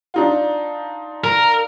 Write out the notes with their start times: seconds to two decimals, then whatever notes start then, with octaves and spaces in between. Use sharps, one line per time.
0.14 D4 D#4 F4
1.24 A#4